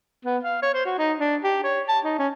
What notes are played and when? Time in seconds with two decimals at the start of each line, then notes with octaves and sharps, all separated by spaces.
0.25 B3
0.43 F5
0.62 C#5
0.73 C5
0.85 F#4
0.98 D#4
1.20 D4
1.44 G4
1.64 C#5
1.88 A5
2.04 D#4
2.19 C#4